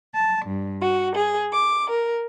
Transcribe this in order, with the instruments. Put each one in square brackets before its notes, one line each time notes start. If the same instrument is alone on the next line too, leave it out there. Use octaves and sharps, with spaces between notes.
[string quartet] A5
G2
F#4
G#4
D6
A#4